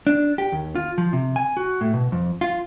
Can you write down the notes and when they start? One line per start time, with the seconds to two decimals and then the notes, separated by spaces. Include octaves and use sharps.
0.07 D4
0.38 G4
0.52 D#2
0.75 F4
0.98 F3
1.13 C3
1.36 G#5
1.57 F#4
1.81 A2
1.94 B2
2.12 F2
2.41 F4